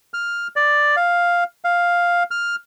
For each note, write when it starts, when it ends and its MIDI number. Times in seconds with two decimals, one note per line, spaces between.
0.14 0.47 89
0.56 0.96 74
0.97 1.44 77
1.65 2.23 77
2.31 2.55 89